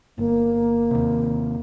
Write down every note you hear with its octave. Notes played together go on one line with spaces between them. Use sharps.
G1 A#3
D#2 C3